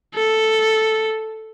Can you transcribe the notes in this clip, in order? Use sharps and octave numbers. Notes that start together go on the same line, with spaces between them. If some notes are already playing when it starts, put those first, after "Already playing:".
A4